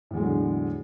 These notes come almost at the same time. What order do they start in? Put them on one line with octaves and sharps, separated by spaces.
A2 E2 G#3 F#3 D3